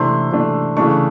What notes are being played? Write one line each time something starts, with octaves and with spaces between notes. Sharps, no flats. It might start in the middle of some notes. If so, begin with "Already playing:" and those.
Already playing: C3 E3 A3 D4 C6
C3 E3 A3 D4
C#3 E3 A3 D4 C#6